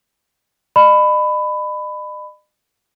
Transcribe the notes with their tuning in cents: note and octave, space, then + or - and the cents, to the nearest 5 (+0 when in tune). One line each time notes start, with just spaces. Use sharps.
D#5 -45 B5 +20